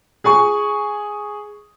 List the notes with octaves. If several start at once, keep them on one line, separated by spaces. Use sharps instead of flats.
G#4 G#5 C#6